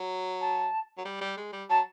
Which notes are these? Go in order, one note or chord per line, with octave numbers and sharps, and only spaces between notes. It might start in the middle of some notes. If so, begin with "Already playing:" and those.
Already playing: F#3
A5
F#3
G3
G3
G#3
G3
F#3 A5